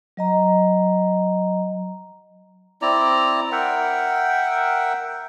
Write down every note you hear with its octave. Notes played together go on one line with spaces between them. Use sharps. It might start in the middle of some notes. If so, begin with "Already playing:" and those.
F#3 D#5 A#5
C4 E4 D5 A#5
A#4 E5 F#5 G5